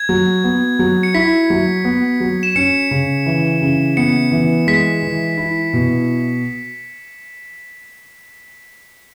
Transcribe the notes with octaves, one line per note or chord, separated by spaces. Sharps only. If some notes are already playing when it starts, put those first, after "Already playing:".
Already playing: G#6
F#3
B3
F#3
C#7
E4 B6
F#3
B3
F#3
E7
C#4 C#7
C#3
E3
C#3
B3 C#7
E3
G#3 B6
E3
E4
B2